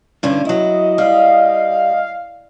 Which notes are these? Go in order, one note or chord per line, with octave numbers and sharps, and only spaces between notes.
G2 D3 C#4
F#3 E4 D#5
G3 F5